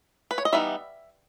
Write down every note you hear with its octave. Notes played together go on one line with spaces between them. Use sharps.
B4
C#5
D#5
E3 G3 B3 D#4 E5